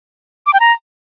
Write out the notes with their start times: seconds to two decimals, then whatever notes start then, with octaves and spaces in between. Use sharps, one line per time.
0.46 D6
0.53 G5
0.60 A#5